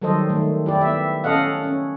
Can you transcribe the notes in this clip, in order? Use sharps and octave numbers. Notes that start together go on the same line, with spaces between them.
D#3 F#3 G3 A4 C5 D#5
D#3 A3
E4 G4 D5
B3 E5
C#4 A4 D#5 F5 F#5
C#4